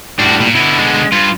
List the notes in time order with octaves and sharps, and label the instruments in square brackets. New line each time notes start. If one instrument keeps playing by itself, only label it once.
[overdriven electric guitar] A2 G3 [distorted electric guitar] D4 F#4
[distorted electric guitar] A#2
[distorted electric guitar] B2 D3 [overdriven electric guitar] E4
[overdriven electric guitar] G#3
[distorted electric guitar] G2 [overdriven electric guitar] F4